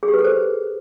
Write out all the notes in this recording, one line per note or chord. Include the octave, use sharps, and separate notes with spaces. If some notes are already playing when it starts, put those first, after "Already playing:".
G#4
G4
B4
A4
C5